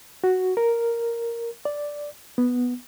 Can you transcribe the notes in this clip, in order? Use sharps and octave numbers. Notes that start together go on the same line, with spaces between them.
F#4
A#4
D5
B3